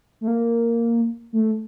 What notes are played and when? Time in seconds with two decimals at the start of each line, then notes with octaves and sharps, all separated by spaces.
0.21 A3
0.28 A#3
1.33 A3